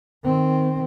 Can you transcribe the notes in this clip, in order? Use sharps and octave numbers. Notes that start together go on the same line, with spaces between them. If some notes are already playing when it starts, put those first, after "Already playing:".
D#3 C4